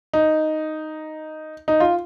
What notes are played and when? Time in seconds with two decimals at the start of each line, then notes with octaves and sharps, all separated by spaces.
0.13 D#4
1.68 D#4
1.80 F4